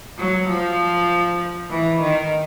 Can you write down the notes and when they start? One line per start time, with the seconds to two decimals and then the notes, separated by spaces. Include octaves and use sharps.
0.19 F#3
0.49 F3
1.70 E3
2.01 D#3